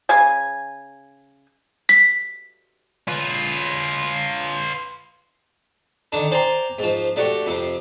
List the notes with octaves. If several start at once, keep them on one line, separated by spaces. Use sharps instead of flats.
C#3 G#5
B6
F4 B4
D3 D#3 D4
C5 D5 G5 G#5 A#5 C6
G#2 F3
A3 D4 F#4 G4
F2 C3